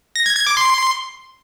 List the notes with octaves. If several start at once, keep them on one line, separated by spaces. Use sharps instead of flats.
A#6
G#6
G#6
D6
C6